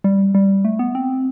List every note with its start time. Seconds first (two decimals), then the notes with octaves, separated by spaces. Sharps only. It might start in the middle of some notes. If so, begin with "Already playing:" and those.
0.04 G3
0.35 G3
0.65 A3
0.79 B3
0.95 C4